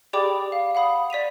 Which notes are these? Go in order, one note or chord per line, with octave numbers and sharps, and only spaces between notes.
G4 G#4 D5 G5 B5 D6
F5
F5 F#5 B5 D#6
D5 B6 D#7 F7